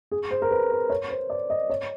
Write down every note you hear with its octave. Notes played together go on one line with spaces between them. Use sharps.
G#4
C5
A#4
B4
C5
C#5
C5
D5
D#5
C#5